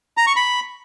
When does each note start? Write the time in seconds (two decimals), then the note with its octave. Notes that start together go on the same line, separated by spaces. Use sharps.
0.17 A#5
0.27 C#6
0.36 B5